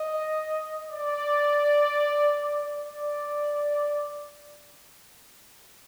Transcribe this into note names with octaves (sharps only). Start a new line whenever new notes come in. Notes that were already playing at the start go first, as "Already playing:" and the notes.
Already playing: D#5
D5
D5